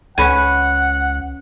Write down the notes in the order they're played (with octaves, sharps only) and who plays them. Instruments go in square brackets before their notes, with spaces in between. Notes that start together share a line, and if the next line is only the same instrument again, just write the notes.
[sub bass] C#2 [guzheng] C#4 B4 G#5 [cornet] F#5